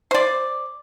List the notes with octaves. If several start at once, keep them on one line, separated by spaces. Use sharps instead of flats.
C5 D5